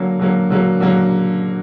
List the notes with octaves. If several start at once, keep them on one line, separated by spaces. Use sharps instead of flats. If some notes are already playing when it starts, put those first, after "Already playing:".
Already playing: D3 F#3 A#3
D3 F#3 A#3
D3 F#3 A#3
D3 F#3 A#3